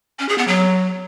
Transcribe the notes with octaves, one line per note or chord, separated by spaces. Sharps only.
C#4
G#4
B3
F#3